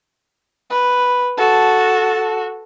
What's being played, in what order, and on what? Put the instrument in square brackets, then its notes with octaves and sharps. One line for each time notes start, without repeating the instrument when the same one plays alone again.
[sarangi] B4
[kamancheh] F#4 A4 [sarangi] A5